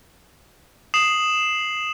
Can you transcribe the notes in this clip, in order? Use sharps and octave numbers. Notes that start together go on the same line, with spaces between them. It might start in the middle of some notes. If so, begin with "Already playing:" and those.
D#6 C7 E7 F#7